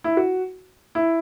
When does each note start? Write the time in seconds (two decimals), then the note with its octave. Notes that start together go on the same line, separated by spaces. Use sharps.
0.04 E4
0.17 F#4
0.95 E4